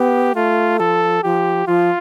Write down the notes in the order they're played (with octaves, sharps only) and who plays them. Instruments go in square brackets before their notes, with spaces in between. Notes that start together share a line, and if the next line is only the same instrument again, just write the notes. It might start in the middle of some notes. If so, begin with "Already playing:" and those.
Already playing: [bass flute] B3 [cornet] G4
[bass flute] A3 [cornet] F4
[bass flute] F3 [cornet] A4
[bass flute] F3 [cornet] G4
[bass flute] F3 [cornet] F4